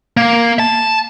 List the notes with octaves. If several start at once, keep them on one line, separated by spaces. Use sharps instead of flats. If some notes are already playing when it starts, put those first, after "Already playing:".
A#3
A5